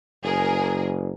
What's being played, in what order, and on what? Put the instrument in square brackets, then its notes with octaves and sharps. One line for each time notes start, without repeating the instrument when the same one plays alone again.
[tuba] F#1 [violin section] G#4 A#4